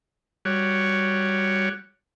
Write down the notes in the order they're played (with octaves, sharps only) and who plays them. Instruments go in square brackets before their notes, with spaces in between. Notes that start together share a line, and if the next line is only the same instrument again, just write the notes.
[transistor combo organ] G3 F#4 C#5